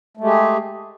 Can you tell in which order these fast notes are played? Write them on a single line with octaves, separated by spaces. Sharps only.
A3 G#3 G4 G#4